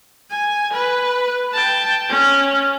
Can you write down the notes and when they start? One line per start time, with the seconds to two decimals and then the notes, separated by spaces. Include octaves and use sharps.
0.30 G#5
0.73 B4
1.53 G5 A5
2.09 C#4